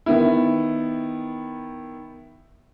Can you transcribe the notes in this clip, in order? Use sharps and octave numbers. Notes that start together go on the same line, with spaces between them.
D#3 B3 E4